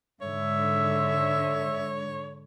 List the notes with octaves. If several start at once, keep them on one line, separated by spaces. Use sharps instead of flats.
G#2 D3 C#5 E5